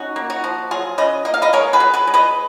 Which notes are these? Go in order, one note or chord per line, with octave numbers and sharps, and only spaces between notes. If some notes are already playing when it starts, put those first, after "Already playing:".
Already playing: C#4 D#4 F#4
A#3
D#4 F#4
F3
F#3 F4 G#4
C#3 B4 D#5
A#3 D#5
F5
B4 D#5
G#3 A#4 C#5
G#4 B4
G#3
G#4 B4
G#3
B4 D#5